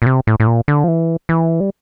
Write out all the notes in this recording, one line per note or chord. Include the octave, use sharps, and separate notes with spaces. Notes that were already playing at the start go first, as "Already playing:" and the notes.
A#2
C3
A2
A2
A#2
D3
F3
E3
E3
G3